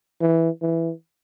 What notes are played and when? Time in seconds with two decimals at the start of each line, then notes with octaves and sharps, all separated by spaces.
0.21 E3
0.62 E3